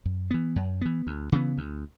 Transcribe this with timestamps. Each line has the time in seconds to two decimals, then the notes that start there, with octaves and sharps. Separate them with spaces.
0.05 F#2
0.31 E3 B3
0.56 F#2
0.81 E3 B3
1.07 D2
1.32 C#3 E3 B3
1.58 D2